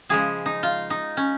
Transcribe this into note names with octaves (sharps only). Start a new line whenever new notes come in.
C#3 F3 G#3 G#4
D#4
F4
D#4
C#4